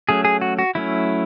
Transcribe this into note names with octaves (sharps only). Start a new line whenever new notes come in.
F#3 A3 C#4 G#4
G#4
F#4
F#4
F#3 A3 C#4 E4